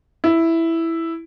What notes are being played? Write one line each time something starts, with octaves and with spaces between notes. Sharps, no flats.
E4